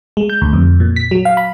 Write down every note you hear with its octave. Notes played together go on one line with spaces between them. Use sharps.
G#3
G6
D2
F2
A#2
B6
F#3
F5
B5